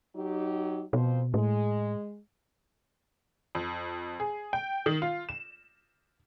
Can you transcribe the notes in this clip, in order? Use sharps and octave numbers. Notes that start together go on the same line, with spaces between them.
F#3 D#4 G4
F2 B2 F3 C5
A2 G#3
F2
G#4
G5
D#3
F4
E7